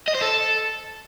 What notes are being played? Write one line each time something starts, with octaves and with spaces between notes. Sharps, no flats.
D#5
C5
A4